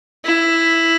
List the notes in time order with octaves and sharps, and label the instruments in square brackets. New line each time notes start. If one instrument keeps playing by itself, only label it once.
[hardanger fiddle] E4